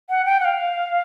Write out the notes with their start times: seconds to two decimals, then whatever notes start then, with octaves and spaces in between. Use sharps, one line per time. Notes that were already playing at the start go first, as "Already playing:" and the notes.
0.10 F#5
0.25 G5
0.40 F#5
0.45 F5